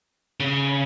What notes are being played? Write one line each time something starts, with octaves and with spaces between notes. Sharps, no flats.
C#3